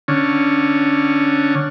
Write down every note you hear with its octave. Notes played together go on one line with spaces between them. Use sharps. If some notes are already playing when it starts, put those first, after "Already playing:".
D3 C#4